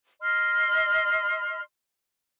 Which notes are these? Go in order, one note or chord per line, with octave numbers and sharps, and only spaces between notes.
D#5 C6 F6